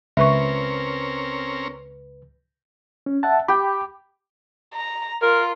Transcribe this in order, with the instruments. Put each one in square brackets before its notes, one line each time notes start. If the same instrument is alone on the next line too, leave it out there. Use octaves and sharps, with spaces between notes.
[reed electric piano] C#2 B4 [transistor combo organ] C4 C#4 A#4 [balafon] E5 C#6
[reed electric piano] C#4
E5 F#5 A5
[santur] G4 [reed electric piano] G5 B5
[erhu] A#5
[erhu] F4 [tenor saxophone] A#4